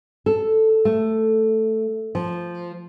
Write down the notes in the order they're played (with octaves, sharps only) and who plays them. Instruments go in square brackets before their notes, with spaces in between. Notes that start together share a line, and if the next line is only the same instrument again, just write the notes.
[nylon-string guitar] A4
A3
F3